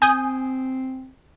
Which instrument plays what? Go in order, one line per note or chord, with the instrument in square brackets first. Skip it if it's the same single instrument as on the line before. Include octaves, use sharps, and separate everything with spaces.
[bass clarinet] C4 [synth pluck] G#5 D#6 G6